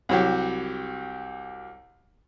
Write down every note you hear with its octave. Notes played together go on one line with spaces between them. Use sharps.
C2 F#3 G4